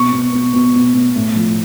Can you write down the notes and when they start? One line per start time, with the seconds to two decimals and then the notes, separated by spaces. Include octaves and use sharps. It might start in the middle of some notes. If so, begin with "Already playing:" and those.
Already playing: B2 C#6
0.12 B2
0.33 B2
0.53 B2
0.73 B2
0.94 B2
1.16 A2
1.36 F3